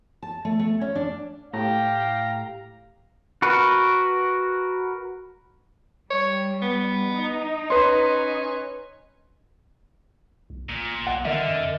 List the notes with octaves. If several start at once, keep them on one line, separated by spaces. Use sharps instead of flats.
A5
A3
A3
C#4
D4
A2 G4 F5 A#5
F#4 A#4 B4
G3 C#5
B3
D#4
C#4 B4 C6
B1
A1 A#2
B1 F#5
D3 D#3 A#4 D#5 E5
F2